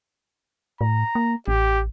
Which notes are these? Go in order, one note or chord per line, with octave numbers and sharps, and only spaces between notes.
A2 A#5
A#3
A1 G4